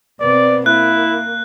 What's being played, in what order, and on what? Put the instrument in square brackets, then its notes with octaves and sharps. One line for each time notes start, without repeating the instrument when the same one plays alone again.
[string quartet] B2 B3 C4 [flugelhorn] D5
[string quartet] A#3 [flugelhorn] E4 [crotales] F#6